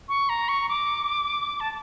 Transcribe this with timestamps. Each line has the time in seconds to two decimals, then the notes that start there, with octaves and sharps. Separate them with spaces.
0.09 C#6
0.29 A#5
0.49 C#6
0.69 D6
1.60 A5